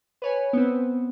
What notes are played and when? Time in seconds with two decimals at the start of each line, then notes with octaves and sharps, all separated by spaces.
0.22 B4 C#5 G#5
0.53 B3 C4